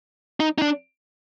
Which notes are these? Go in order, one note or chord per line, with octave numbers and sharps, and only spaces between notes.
D#4
D#4
D4